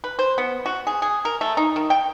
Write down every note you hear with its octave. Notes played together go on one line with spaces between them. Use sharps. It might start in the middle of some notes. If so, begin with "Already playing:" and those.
B4
C5
B3
F#4
G#4
G#4
A#4
A3
D#4
D#3
G5